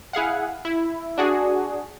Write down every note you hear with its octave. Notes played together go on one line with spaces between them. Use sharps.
E4 G#4 F5 F#5
E4
D4 F#4 G#4